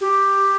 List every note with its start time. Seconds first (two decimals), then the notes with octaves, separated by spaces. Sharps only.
0.01 G4